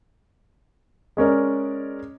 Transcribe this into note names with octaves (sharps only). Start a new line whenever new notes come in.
G#3 C#4 A#4 D5